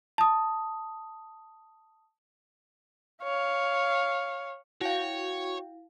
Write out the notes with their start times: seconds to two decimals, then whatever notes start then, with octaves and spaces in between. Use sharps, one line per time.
0.18 A5 D#6
3.24 C#5 F5
4.81 E4 F#4 C#5 F5 G5